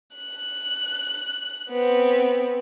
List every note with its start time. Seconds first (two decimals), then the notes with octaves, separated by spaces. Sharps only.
0.16 F#6
1.70 B3 C4